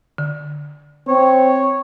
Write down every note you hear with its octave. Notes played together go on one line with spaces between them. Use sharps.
D3
C4 C#5